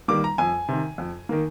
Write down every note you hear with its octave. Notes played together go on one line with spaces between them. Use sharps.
D#3 G3 A#3 D6
A#5
F2 G#5
C3 D#3
F2
D#3 A#3